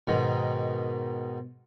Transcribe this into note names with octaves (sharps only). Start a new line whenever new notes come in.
G#2 B2 D#3